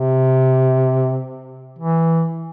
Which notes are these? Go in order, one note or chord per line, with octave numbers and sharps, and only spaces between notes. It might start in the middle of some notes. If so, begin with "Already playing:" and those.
Already playing: C3
E3